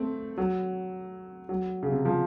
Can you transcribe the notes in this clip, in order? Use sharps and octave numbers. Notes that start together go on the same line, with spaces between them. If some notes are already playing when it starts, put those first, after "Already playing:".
Already playing: A3 C4
F#3
F#3
C#3
C3
F3